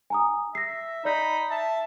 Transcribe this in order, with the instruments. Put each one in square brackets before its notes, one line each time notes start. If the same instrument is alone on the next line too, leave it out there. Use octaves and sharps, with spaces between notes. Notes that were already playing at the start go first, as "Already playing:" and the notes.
[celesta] G#5 A#5 D#6
[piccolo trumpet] E5 [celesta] A#6 C7
[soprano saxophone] D#4 [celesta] D5 G6 [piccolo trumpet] B5
[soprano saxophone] E5 [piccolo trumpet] A5